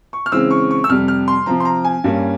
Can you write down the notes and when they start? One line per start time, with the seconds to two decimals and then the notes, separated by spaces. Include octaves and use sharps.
0.13 C#6
0.26 F6
0.32 C#3 E3 G#3 C4 E6
0.51 C#6
0.71 C#6
0.84 E6
0.89 F2 C3 G3 F6
1.08 F6
1.28 C6
1.46 C3 F3 C4 A#5
1.60 C6
1.65 A#5
1.84 G#5
2.04 G2 G3 A#3 C#4